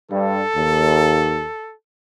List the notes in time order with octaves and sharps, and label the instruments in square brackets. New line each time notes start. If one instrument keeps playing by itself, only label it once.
[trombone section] G2 [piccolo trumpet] A4
[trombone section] D#2